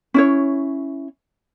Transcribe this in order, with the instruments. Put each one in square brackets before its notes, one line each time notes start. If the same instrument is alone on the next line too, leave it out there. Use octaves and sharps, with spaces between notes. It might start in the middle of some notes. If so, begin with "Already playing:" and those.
[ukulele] C#4 E4 C#5